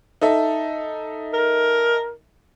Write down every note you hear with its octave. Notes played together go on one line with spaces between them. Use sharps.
D#4 A4 E5
A#4